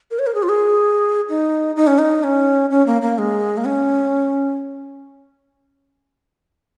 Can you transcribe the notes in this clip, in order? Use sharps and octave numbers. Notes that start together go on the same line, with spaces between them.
A#4
C#5
A#4
G#4
F4
G#4
D#4
D#4
C#4
D#4
C#4
C#4
A#3
A#3
G#3
A#3
C#4